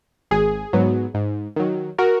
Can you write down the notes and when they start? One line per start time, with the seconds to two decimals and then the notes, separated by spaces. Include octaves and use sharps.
0.31 G#1 G#4
0.73 G#2 F#3 B3
1.14 G#2
1.56 D#3 F#3
1.98 F#4 A#4